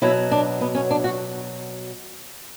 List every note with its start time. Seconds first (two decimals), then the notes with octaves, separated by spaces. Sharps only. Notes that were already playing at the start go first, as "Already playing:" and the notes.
0.02 B2 F#3 E4
0.31 D4
0.61 B3
0.75 C#4
0.91 D4
1.04 F#4